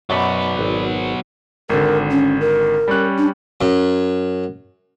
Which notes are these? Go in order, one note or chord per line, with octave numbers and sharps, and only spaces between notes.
F#2 B2 F#3 B3 F#4 D5 B5
G#1 B4
G#1 D3 A#4
C#4
A#4
G3 C#4 F#6
D4
F#2